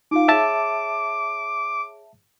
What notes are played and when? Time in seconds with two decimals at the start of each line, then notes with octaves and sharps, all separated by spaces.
0.11 D#4 F4 F5 D6
0.28 G#4 C#5 E5 A5 E7